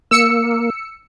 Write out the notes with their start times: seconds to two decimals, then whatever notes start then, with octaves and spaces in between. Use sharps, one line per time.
0.11 A#3 E6 C#7